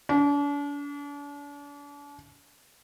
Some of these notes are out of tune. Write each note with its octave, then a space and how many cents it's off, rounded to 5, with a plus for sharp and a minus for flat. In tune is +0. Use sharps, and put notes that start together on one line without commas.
D4 -40